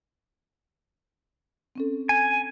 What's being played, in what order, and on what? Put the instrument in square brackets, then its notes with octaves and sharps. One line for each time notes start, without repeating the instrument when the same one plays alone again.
[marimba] C4 C#4 A4
[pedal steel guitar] G#5